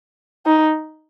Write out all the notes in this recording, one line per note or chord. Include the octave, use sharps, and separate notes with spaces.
D#4